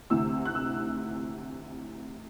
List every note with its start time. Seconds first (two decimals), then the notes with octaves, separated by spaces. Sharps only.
0.10 D2 C3 E3 E6
0.45 F#6
0.55 E6